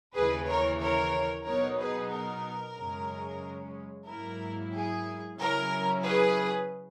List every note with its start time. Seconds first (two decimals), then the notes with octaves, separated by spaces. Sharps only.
0.15 D#2 C#3 E3 G#4 B4
0.48 A#4 C#5
0.81 A#4 C#5
1.46 B2 F#3 B3 D#4 A#4 C#5
1.79 G#4 B4
2.11 A#4
2.76 F#2 C#3 G#3 C#4
4.07 G#2 F#3 A#3 E4 A#4
4.72 G#4
5.37 C#3 F#3 C#4 E4 A#4
6.03 G#4 B4